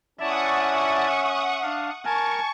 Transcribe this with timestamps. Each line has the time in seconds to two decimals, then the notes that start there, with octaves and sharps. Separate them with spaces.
0.20 C#4 E4 D5 E5 F#5 A5 C#6 D#6
1.62 D4 F5
2.05 A#4 G#5 A5 C#6